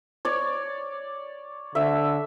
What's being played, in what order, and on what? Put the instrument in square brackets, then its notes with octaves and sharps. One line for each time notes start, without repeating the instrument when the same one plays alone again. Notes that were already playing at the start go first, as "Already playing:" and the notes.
[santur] C#5 D5
[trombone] D3 [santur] E5